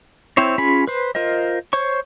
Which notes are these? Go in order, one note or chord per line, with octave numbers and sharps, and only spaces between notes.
C4 E4 C5 C#5
C#4 F4 G#4 B5
B4 C5
F4 A#4 C5 D#5
C5 C#5 C#6